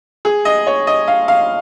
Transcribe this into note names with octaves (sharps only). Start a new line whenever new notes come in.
G#4
D#5
C#5
D#5
F5
F5